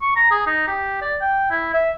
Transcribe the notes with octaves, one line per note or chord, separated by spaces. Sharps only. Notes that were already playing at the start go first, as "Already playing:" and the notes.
C#6
A#5
G#4
D#4
G4
D5
G5
E4
E5